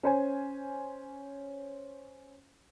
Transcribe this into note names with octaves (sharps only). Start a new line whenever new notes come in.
C#4 C5 G#5